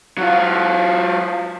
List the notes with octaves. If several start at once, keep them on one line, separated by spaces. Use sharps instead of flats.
F#3 F4